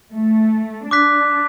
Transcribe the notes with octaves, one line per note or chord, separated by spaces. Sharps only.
A3
D4 D6 F#6 B6